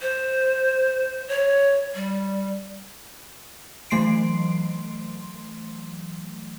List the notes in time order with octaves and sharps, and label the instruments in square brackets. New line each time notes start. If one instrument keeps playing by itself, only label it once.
[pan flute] C5
C#5
G3
[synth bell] E3 F#3 A3 C6 C7 D7